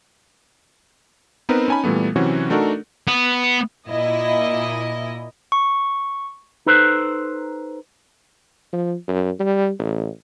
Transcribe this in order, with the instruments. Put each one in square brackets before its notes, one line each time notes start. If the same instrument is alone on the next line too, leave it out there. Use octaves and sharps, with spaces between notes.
[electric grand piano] B3 C4 D#4 A#4 B4
C#4 D#4 G#5 A5 B5
A#2 E3 G3 A3 B3
C3 E3 F#3 C4 C#4 F#4
A3 D4 D#4 F#4 A4 A#4
[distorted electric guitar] B3
[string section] A#2 E4 D#5
[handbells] C#6
[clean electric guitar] D#4 A4 B4 C5
[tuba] F3
F#2
G3
A1